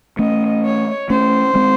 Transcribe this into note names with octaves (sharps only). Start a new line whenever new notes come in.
A3 C#4 D#5
C#5
A3 C#4 C5
G#3 C4